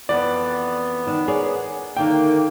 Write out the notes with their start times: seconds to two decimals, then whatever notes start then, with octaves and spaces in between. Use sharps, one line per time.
0.09 F2 E3 B3 B4 D5
1.07 D#3 D4
1.28 G#4 A#4 C#5 D5
1.97 D3 D#3 A#3 E5 G5